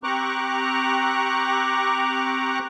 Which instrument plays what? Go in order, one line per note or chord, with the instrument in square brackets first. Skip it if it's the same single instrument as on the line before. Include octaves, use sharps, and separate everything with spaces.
[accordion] C4 G4 A#5 C#6 D6 F#6